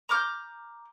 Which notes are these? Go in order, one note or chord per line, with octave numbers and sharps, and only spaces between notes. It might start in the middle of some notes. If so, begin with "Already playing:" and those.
A#5 D6 F6 G6